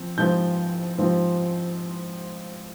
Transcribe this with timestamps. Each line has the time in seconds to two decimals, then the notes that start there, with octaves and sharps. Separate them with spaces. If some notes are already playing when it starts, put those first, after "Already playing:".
Already playing: F3 C4
0.18 G#2 F3 C4 G6
0.98 G#2 F3 C4